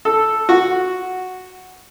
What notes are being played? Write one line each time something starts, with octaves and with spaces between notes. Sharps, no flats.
A4
F#4